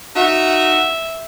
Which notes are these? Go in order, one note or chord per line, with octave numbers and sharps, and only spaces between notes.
D#4 F#4 E5